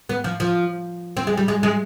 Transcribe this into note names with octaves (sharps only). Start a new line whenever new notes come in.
B3
F3
F3
C4
G#3
G3
G#3
G#3